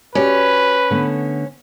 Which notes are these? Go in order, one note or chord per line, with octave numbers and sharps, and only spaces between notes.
C#4 F#4 G4 B4 D5
D3 A3 B3